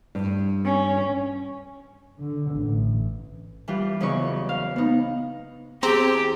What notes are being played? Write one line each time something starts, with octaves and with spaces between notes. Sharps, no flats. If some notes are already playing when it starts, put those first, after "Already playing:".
G2
C#4
D3
A1
E3 G3 F4 G4
E2 C#3 F#3 E4 D#5 C#6
F5
B3 D#4
E2 C4 G4 G#4 G5 A#5